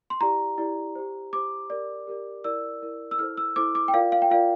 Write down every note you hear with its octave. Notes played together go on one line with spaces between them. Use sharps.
C6
E4 G4 D5 A#5
E4 G4 D5
G4 C5
G4 C5 D6
G4 A#4 D5
G4 A#4 D5
E4 A#4 D5 E6
E4 A#4 D5
E6
E4 A4 C5 F6
E6
E4 A4 C5 D6
D6
G5
F4 A#4 D5 F5
F5
G5
F4 A#4 D5 F5